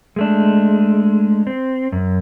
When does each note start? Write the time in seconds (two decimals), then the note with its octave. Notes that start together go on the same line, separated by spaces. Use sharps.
0.16 G#3 A3 D4
1.47 C4
1.92 F#2